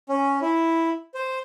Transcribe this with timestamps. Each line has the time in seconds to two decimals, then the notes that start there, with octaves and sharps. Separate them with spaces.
0.09 C#4
0.42 E4
1.14 C5